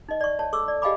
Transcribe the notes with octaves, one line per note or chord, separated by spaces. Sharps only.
D#4 D#5
D5 C#6
C#5 A5
A4 C#6 D6 E6
D5
G4 D#5 F5 G#5 B5 D6